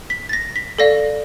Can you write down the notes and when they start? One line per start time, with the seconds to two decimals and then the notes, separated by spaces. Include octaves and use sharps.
0.10 B6
0.29 A6
0.33 A#6
0.56 B6
0.79 A4 D5 F5 A#6